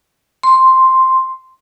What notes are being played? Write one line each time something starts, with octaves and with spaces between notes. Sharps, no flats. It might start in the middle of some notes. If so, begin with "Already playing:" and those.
C6